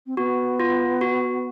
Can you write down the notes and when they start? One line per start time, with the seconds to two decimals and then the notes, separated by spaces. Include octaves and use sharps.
0.07 C4
0.17 B3 F#4
0.60 F4
1.01 F#4